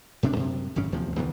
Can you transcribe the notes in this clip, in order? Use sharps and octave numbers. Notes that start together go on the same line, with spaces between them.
D1 C3 C#4 D4
F#2 C3
G#1 F#2 C#3 C#4
D1 E2 C3 F3
C#2 D#3 E3 B3